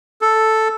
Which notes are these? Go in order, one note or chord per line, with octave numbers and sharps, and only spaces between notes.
A4